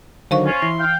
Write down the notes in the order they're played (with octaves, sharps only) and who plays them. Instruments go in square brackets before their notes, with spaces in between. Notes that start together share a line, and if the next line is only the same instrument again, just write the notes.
[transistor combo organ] D3 D#3 F#3 [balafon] C5 F5 C#6
[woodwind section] C#4 F4
[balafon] E3 [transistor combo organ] E4 C6
[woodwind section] F5 G5